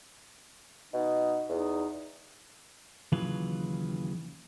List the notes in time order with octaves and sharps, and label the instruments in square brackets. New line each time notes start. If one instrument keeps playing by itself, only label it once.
[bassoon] B2 [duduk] D#4
[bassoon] E2 [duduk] D#4
[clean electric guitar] D#2 C#3 E3 F#3 F4 B4